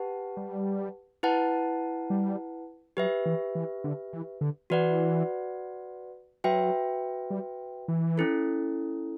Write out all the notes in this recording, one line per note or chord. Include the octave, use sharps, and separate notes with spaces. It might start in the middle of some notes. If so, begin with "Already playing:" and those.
Already playing: G4 B4 F#5 A5
G3
E4 B4 F#5 A5
G3
F#3 G4 B4 E5
E3
E3
D3
E3
D3
E3 F#4 B4 D5 F#5
F#3 F#4 B4 E5 G5
G3
E3
C#4 E4 A4